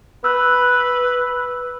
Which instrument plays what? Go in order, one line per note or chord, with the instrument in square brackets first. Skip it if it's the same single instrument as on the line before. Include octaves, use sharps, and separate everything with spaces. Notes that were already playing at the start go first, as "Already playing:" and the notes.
[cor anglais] B4 [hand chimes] E6 F#6